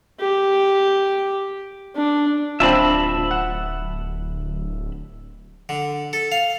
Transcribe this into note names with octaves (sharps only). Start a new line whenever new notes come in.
G4
D4
D1 C4 D4 F4 E5 A5 B5
F#5
D3
A4
F5